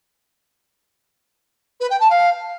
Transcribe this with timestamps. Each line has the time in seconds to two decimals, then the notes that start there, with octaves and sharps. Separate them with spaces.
1.80 B4
1.90 G5
2.00 A5
2.10 F5